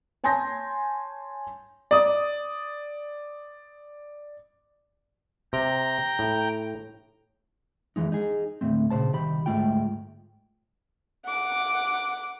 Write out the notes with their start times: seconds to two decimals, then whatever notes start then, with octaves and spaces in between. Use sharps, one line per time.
0.24 C#5 G#5 A5 C6 G6 A#6
1.91 D5 D#6
5.53 C3 G5 A#5
6.19 A2
7.96 F2 G#2 E3 G#3 D#4
8.12 D#4 G#4
8.61 D2 A2 C#3 A3 C4
8.90 A#2 C#3 C5 A5
9.13 C2 D#3 G4 B5
9.46 D2 G#2 G#3 A3 F4 G5
11.26 F#5 D6